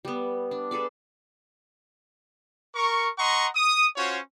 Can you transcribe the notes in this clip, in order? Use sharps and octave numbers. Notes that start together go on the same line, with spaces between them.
G3 B3
D4
G#4 A4 B4 D5
A#4 C#6
D#5 F#5 A#5 C6 C#6
D#6
C#4 F4 F#4 C5 C#5